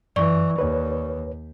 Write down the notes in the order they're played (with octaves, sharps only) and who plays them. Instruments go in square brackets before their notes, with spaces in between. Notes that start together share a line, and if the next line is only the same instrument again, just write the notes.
[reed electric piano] F#2 [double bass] E3 [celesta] D5 C#6
[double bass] D#2 [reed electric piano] B4 C#5